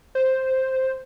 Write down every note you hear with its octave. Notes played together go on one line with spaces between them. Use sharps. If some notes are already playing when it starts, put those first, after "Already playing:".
C5